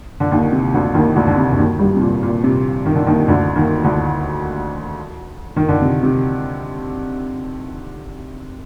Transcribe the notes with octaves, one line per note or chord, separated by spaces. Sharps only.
D3
D#2 D#3
C3
D2 D3
D#2 D#3
D2 D3
D3
C3
D3
D#2 D#3
G2 G3
C3
A#2
A#2
C3
D#3
D3
D#2 D#3
D2 D3
D#2 D#3
D2 D3
D#3
D3
C3
C3